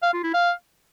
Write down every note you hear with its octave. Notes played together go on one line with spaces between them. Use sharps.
F5
F4
E4
F5